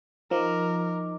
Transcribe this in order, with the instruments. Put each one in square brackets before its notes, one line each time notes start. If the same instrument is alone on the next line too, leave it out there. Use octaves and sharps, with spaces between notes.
[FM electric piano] F3 [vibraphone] D#4 D#5 D6 [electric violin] A#4